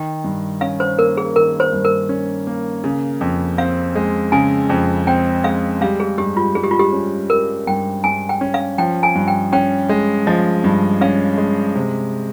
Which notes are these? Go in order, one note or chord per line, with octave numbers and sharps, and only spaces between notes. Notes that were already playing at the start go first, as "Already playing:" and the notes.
Already playing: D#3 G5
G2
C#4 F5
C5
A#3 A#4
G#4
D#3 A#4
C5
G2
A#4
C#4
A#3
C#3
F2
C4 F5
G#3
C#3 G#5
F2
C4 G5
G#3 F5
G3 F5
G#4
G2 G4
F4
G2 G#4
G4
F4
G4
C#4
G3 A#4
G2 G5
G2 G#5
G5
C#4
F5
F3 G5
G#5
G2
G5
C#4 G5
G#3
F3 D#5
G2
C#4 F5
G#3
C3